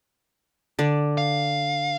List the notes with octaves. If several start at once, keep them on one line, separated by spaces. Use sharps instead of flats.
D3 D5
F5